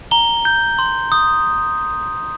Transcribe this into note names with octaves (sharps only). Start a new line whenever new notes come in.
A#5 G7
G6
C6
D#6 G6